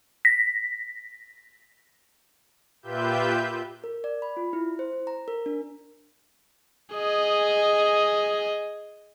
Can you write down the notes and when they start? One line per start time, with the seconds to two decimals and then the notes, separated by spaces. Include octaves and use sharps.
0.25 A#6 B6
2.82 A#2 F4 G4 B4 E5 G6
3.84 A#4
4.04 D5
4.22 B5
4.37 F4
4.53 E4
4.79 C5
5.07 A#5
5.28 A#4
5.46 D4
6.94 G#4 D#5